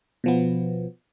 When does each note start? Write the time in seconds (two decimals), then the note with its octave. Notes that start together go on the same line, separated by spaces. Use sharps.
0.24 B2 F3 B3